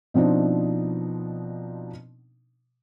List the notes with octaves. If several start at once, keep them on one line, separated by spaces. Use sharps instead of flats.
B2 F3 C4 D4 D#4